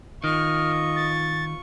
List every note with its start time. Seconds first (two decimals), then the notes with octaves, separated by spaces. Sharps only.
0.24 D#3 F4 D#5 C#6 F6
0.96 A6